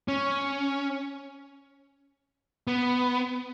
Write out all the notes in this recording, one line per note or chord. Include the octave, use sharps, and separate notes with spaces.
C#4
B3